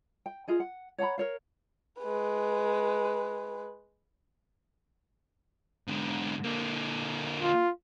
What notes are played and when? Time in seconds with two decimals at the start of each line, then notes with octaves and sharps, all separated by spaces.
0.26 G5
0.48 F4 G#4 D#5
0.60 F#5
0.98 C#5 F#5 A#5 B5
1.18 A#4 C#5 F5
2.00 G#3 B4
5.87 G#2 D3
6.44 D3 A#3
7.42 F4